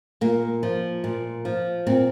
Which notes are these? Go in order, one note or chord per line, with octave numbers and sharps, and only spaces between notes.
A#2 A#3
F3
A#2
F3
A#2 C4